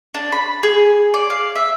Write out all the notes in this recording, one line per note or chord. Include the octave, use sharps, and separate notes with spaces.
D4
B5
G#4
D5
F5
E5